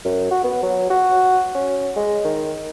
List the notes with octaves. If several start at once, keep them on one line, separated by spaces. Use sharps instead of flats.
F#2
F#4
B3
F#3
F#4
C#4
G#3
D#3